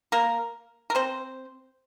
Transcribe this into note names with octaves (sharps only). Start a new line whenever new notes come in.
A#3 A#4
A#4
C4 C5